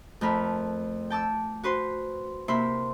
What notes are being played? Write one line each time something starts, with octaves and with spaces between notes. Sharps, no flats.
F2 A3 A#4 B5 F6
G5 A5 D6 E6
F#4 B4 C5 C6
C3 A#3 E4 E5 B5 C6